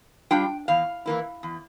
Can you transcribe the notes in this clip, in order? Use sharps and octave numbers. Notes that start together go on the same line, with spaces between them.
G3 D4 F4 G5
E2 F5
E3 A#3 E4
E2